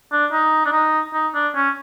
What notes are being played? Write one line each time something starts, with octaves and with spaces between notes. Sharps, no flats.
D4
D#4
D4
D#4
D#4
D4
C#4